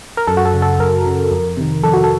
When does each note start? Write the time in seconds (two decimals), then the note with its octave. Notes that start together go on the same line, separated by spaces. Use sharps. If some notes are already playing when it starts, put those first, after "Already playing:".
0.17 A#4
0.27 F#2 A4
0.37 F#4
0.45 A4
0.54 C#3
0.62 A4
0.79 F#2 A#4
1.06 C#3
1.31 F2
1.57 C3 D#3
1.83 F2 A4
1.93 F#4
2.04 A4